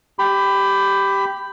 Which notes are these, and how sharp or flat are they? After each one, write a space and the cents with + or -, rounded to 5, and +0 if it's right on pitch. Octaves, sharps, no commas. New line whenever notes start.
G4 +0 B5 +20